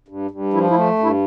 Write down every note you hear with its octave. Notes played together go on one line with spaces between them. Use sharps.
G2
G2
F3 E4
E4
A3
G2 E4